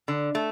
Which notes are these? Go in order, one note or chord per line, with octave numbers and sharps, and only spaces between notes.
D3
A3